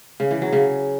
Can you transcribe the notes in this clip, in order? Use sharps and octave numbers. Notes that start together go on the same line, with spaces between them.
C#3
E3
F#3
C#3